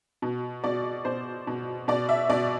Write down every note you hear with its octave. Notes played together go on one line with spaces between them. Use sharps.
B2
B2 D5
B2 C5
B2
B2 D5
E5
B2 D5